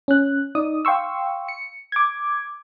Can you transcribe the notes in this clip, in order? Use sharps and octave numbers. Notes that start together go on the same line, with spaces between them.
C#4 F#6
D#4 D5 D#6
F5 G5 C6 C#6 E6
C#7
D6 G#6